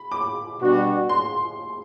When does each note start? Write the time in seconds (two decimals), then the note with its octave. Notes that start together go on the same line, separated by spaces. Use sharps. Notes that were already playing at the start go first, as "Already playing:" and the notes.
Already playing: B5
0.12 D6
0.60 B2 G3 D4 F#4
1.09 C6